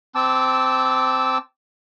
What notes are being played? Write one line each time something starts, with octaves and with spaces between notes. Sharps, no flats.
C4 A5 D6 E6